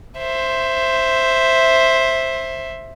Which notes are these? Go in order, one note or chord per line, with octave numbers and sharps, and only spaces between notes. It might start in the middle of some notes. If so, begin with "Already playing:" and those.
C5 E5